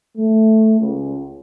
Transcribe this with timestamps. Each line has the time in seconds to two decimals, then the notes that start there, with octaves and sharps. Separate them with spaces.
0.17 A3
0.79 C#2